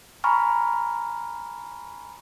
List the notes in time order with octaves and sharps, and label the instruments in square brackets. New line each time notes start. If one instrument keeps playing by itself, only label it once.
[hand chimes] G#5 A#5 B5 C#6 F6